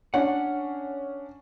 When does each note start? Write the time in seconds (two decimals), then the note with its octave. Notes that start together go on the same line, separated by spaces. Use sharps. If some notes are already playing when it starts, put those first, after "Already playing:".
0.14 C#4 D4 F#5